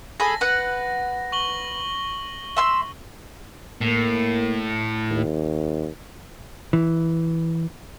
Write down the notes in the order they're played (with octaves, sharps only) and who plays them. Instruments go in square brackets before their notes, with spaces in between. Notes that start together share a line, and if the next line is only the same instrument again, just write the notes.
[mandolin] G#4 A4 B5 [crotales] A#6
[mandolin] B4 F#5
[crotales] C#6 F#7 G7
[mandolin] E5 C6 E6
[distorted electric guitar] A2 [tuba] A#3
[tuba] D#2
[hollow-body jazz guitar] E3